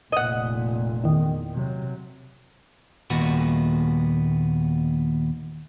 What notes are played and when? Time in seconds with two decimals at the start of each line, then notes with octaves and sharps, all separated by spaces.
0.12 F1 A#2 D#5 F#5
1.04 E2 D#3
1.52 C3 F#3
3.10 D#2 A#2 B3 F#4